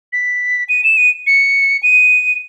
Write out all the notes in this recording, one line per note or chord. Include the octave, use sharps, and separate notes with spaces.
B6
D#7
E7
D#7
C#7
D#7